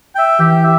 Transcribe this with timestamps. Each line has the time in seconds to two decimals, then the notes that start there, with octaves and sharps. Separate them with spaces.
0.15 E5 G5
0.39 E3 G4
0.63 E5